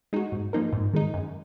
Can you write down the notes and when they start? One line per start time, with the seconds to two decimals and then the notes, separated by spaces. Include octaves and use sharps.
0.13 G#3 D#4 F#4
0.32 G#2
0.53 F3 A#3 D#4 A#4
0.73 G#2
0.93 D#3 G#3 D#4
1.14 F#2